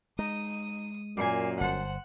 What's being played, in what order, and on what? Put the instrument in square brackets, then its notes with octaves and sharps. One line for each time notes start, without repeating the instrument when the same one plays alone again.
[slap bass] G#3 [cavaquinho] D#4 [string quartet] D#6
[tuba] F#2 [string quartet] A#2 [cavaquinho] D5 G#5
[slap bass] G1 [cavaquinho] C5 A5 [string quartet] F#5